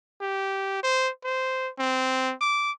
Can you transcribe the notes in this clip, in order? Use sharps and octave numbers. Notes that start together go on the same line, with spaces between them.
G4
C5
C5
C4
D6